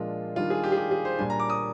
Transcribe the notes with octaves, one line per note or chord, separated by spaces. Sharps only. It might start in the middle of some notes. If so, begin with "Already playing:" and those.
Already playing: A#2 F3 G#3 D4 F4
D#3 G3 D4 F4
G#4
G4
G#4
G4
G#4
C5
A#2 G3 D4 G#5
A#5
D6
D#6